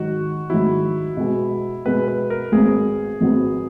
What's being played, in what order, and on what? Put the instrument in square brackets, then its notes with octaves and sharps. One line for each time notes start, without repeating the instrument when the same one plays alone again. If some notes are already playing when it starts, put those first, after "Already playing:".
Already playing: [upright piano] G#2 D#3 F#3 [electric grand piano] F#4
[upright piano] G#2 D#3 F#3 [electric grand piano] E4
[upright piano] B2 G#3 B3
[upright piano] B2 G#3 B3 [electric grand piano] B4
[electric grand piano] B4
A#4
[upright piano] G#1 G#2 F#3 B3 [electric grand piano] G#4
[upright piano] G#1 G#2 F#3 B3